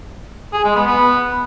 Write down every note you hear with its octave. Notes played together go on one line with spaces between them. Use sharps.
G#4
G#3
B3
B3